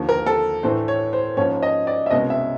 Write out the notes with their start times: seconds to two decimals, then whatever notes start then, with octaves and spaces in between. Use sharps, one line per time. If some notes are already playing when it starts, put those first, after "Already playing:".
Already playing: D#2 D3 F3
0.09 A#4
0.26 A4
0.63 A2 E3 A3 D4 C5
0.88 C#5
1.13 C5
1.37 G#2 F3 A#3 C#4 C#5
1.63 D#5
1.87 D5
2.06 E5
2.11 C2 B2 G#3 C#4 D#5
2.30 E5